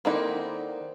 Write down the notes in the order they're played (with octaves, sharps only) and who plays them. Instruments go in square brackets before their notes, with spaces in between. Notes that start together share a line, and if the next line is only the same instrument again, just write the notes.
[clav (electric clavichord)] D#3 A#3 [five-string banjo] C4 D#4 E4 [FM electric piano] A4 D5 F#5